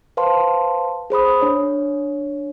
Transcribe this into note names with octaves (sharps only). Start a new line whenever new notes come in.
B4 C5 F5 A5 C6
G#4 C5 B5 D#6
D4 C#5